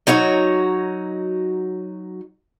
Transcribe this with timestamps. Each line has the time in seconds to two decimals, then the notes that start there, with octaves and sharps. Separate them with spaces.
0.07 F#3 D#4 F#4 C#5